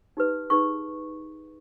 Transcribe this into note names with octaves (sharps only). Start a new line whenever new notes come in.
D#4 G4 B4
D#4 G#4 B4 C#6